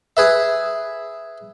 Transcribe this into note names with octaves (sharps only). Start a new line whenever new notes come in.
G#4 B4 E5